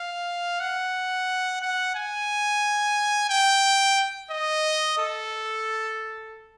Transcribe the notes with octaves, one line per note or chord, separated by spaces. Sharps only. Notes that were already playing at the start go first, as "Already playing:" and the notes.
Already playing: F5
F#5
F#5
G#5
G5
D#5
A4